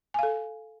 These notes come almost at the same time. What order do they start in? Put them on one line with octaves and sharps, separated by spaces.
G#5 F5 A4